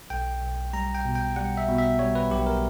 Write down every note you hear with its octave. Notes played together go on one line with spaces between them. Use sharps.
B1 G5
B1
G3 A#5
G5
B2
G5
G3 F#5
E5
B2
E5
G3 C#5
B4
B1 G4
A#4